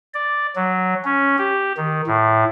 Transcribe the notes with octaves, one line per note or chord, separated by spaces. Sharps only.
D5
F#3
C#4
G4
D#3
A2